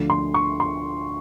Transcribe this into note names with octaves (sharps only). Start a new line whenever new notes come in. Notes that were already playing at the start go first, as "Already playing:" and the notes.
Already playing: D2 D3 F3
C6
C#6
C6